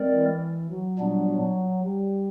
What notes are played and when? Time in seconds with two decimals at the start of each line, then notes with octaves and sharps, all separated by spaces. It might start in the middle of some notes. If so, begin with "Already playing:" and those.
Already playing: G#3 C4 A#4 D5
0.14 E3
0.70 F#3
0.99 A#2 G3 B3 D4
1.27 F#3
1.84 G3